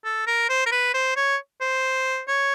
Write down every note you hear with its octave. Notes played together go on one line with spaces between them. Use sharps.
A4
A#4
C5
A#4
B4
C5
C#5
C5
C#5